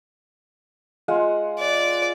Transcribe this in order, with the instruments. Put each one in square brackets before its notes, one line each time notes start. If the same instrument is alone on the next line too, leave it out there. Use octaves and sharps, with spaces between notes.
[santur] G#3 F4 F#5
[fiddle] D5